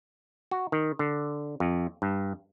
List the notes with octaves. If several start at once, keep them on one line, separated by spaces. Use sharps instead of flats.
F#4
D#3
D3
F2
G2